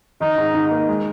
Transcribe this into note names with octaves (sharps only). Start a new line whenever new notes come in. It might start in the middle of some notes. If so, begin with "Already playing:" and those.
D#3 D#4
G#2
G#2
A#3
G#3